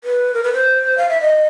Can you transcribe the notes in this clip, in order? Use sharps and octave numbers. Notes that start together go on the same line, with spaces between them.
B4
A#4
B4
C5
F5
E5
D#5